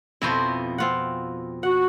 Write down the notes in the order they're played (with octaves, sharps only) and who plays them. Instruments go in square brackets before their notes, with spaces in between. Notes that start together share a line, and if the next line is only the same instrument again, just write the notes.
[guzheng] F2 B2 C5 [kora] F3 E4
[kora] C4 F4 F#5
[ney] F#4 [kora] F#5